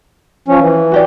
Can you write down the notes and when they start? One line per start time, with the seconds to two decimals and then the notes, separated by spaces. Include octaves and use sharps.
0.48 F3 C#4
0.60 E3
0.92 F#4 G4 D5